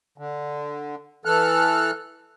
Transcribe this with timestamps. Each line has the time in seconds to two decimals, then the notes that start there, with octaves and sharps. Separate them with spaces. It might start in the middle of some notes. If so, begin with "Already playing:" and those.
0.18 D3
1.25 E3 A4 F6 F#6